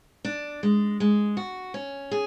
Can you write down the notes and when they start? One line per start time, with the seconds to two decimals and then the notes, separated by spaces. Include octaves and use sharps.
0.24 D4
0.63 G#3
1.00 G#3
1.37 F#4
1.74 C#4
2.11 G#4